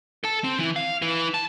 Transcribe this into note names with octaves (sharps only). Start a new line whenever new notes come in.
A4 A5
C4
E3 E4
F5
E4 B4
A5